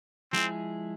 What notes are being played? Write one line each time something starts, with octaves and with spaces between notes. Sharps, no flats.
F3 G#3 B3 C4 E4 G#4